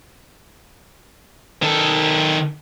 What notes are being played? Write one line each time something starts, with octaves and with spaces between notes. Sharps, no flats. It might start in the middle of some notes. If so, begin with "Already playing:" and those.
D#3 A4